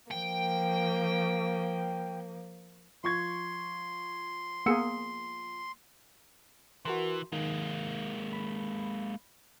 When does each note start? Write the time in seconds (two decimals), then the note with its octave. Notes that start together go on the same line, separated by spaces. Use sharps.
0.11 F3 A#3 G5
3.04 F3 C6 C#6 G#6
4.66 A#3 B3 G#4 E6 C#7
6.85 E3 F#4 A#4 C6
7.32 D#3 G#3 A#3
8.33 B5